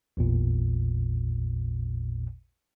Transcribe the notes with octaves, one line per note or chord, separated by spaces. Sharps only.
A1 E2 A#2